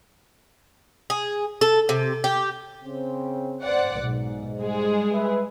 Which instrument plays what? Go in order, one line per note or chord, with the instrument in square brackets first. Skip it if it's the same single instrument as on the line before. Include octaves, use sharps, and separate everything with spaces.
[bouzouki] G#4
A4
C3
G4
[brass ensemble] C#3 C4
[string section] C5 D5 F#5
[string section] B1 [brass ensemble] G#2
[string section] G3 G#3 G#4
[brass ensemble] B4 E5